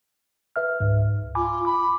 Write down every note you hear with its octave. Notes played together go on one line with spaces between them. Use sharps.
B4 E5 F6
C#2 G#2
F4 G#5 B5 D6
B5 D6